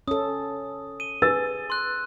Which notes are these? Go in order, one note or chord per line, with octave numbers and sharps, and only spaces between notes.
C#4 A4 D#6
D#7 G7
G#4 B4 E6 A6
C6 F#6